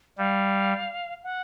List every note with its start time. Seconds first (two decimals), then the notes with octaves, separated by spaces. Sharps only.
0.18 G3 F5
1.23 F#5